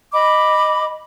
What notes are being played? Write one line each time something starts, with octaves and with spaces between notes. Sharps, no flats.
D#5 B5 D6